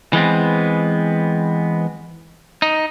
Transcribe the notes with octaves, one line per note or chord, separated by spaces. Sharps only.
E3 G#3 B3 C4
D#4